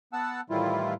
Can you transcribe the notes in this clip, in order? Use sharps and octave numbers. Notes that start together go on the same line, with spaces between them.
B3 F#5 A5 E6
A2 D#3 E3 G3 E4 F4